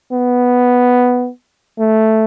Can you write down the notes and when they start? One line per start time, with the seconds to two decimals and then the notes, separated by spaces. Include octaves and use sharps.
0.13 B3
1.79 A3